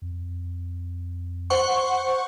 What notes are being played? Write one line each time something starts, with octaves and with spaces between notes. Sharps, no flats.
F2
C5 F#5 C#6